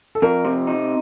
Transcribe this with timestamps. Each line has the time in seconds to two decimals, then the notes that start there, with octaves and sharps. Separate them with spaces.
0.15 A4
0.22 F2 A#4
0.45 C3
0.67 D#4